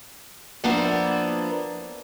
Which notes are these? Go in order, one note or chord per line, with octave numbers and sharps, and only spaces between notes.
F3 A#3 B3 D4 E4 C5